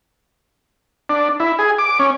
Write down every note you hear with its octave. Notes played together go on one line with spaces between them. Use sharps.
D4
E4
G#4
D6
C#4